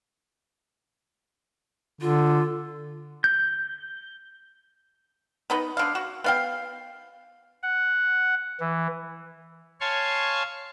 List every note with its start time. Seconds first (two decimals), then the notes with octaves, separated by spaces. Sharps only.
2.01 D3 F4
3.24 G6
5.50 B3 D#4 B4
5.77 D3 F5
5.95 F#4
6.24 B3 F5 G5
7.63 F#5
8.60 E3
9.80 C#5 F5 G#5 A5 C6 C#6